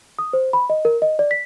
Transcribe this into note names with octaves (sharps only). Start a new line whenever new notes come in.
D#6
C5
B5
D#5
A#4
D#5
D5
B6